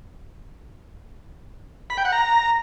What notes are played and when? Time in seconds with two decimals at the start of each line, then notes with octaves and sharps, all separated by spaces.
1.90 B5
1.97 G5
2.05 F#5
2.12 A#5